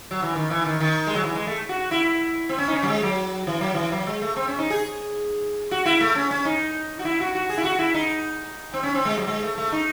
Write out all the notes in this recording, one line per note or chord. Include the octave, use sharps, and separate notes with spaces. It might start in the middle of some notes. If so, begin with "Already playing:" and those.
F#3
E3
D#3
E3
D#3
D#3
G#3
F#3
E3
G#3
A3
F#4
E4
C4
C#4
D#4
C#4
F#3
G#3
F#3
E3
F#3
E3
F#3
G#3
A3
C4
C#4
D#4
G#4
F#4
E4
A3
C#4
C#4
D#4
F#4
E4
F#4
F#4
G#4
E4
F#4
E4
D#4
C4
C#4
C4
G#3
F#3
G#3
A3
A3
D#4